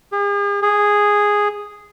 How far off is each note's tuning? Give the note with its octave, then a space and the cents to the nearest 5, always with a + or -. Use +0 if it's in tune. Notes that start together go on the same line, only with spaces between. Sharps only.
G#4 -45
G#4 -5